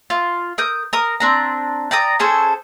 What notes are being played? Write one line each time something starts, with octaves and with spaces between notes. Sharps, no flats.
F4
A#4 D#6 G6
A#4 D#6
C4 D4 A#5
D5 G5 A#5 D#6
C#4 G#4 A4 C5